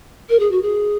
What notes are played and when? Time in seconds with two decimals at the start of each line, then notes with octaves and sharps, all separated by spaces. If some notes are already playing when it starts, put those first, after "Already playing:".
0.29 A#4
0.40 G#4
0.51 F#4
0.62 G#4